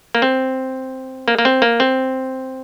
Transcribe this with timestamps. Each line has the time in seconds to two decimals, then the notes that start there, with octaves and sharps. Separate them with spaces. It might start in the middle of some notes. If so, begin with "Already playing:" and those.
0.15 A#3
0.22 C4
1.28 A#3
1.39 A#3
1.45 C4
1.62 A#3
1.80 C4